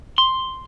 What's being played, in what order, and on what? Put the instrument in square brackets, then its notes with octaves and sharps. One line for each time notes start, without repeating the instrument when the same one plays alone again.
[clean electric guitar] C6